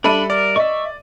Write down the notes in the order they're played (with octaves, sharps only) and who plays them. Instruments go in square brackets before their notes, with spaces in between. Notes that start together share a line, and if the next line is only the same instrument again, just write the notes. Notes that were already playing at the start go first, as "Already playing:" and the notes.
[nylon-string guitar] G3 E5 [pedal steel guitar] D4 [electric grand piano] A4 B5 D#7
[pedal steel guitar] A#4 [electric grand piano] D5
[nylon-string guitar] D#5 [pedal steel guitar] E5 C#6